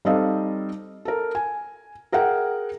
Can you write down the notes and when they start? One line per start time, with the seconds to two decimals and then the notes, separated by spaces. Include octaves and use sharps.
0.05 G3 C4 D#4 A4 D#5 F5
1.05 A4 A#4
1.35 G#5
2.12 G#4 A#4 E5 F#5 G5